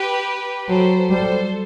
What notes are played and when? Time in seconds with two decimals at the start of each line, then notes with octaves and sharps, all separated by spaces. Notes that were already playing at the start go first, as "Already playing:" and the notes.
Already playing: G4 B4
0.68 F#3 A4 C5
1.10 G3 A4 C5